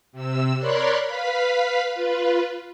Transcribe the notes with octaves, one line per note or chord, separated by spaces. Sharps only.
C3 E6
A#4 C#5 D5 B5 C6 F#6
B4 F5 B5
F4 B4